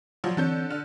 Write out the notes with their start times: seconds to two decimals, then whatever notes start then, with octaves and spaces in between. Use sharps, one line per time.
0.24 F3 F#3 F4 D5 C6
0.37 D3 E3 C4 A4 C#5 G6
0.70 D3 F6